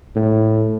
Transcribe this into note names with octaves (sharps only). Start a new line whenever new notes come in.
A2